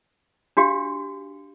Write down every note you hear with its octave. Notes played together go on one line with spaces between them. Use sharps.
D4 F#4 G4 F5